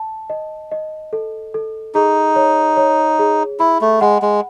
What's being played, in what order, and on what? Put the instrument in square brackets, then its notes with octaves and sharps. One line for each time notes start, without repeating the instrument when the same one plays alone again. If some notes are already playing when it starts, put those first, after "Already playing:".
Already playing: [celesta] A5
D#5
D#5
A4
A4
[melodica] D#4 [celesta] G#4
[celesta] C#5
C#5
G#4
[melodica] E4 [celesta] B5
[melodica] A3
[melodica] G#3 [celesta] F#5
[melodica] G#3